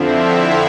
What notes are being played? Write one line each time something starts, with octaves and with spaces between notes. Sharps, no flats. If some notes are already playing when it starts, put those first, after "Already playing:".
Already playing: F2 D3 F3 C4 E4 E5